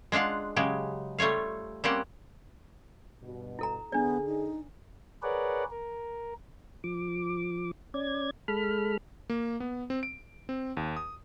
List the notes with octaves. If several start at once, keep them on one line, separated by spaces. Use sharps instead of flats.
G#3 D4 F4 F5 F#5
C#3 F#3 G#3 G4
G3 A3 F4 C#5 F5
G3 A#3 C4 C#4 G4 F#5
G2 B2
E4 A4 A#5
D3 B3 D4 G#4 D5
D#4
G#4 A#4 B4 C#5 D5 F#5
A#4
F3 D6
C#4 D5 G#6
G#3 A4 B5 F6
A#3
B3
C4
D7
C4
D#2
D#6